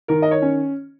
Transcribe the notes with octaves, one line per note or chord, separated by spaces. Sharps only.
D#3 A#4
D#5
C#5
C#4